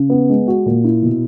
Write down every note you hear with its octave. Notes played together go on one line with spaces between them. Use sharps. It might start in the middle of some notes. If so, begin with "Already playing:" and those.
Already playing: C#3
B3
G#3
F#4
A#2
E4
B2